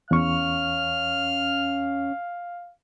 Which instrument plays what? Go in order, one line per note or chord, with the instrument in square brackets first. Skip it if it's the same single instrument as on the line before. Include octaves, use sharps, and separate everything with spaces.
[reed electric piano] E2 C#6 [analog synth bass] C#4 [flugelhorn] F5 [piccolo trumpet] F6